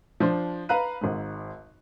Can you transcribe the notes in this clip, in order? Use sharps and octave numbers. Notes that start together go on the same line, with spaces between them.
F3 D4 C5
B4 F5 A#5 F#6 D#7
G#1 G#2